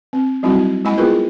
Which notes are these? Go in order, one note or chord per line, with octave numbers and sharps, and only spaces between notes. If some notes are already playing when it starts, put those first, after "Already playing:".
C4
F#3 G3 C4 D#4 E4 F#4
G#3 A#3 E4 D#5 G#5 B5
B3 E4 F4 G#4 A#4 B4